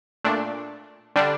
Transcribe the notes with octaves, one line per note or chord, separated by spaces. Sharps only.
A#2 A3 D4
D3 G3 D4